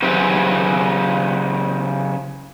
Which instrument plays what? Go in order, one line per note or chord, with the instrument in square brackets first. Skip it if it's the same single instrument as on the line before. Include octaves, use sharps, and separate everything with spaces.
[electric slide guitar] C#3 F#3 G4 B4 C5 E5